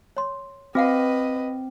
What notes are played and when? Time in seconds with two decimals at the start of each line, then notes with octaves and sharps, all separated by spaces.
0.17 C#5 C6
0.75 C4 F#4 B4 D#5 F5 F#5